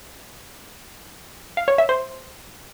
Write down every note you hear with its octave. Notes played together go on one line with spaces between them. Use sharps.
F5
C#5
E5
C5